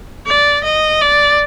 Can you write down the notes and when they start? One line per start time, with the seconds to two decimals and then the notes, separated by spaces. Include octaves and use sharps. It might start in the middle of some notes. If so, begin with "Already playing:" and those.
0.27 D5
0.64 D#5
1.01 D5